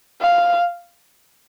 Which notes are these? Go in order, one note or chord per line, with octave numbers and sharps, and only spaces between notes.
F5